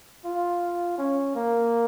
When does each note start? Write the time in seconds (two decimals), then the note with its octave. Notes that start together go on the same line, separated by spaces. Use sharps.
0.25 F4
0.98 C#4
1.35 A#3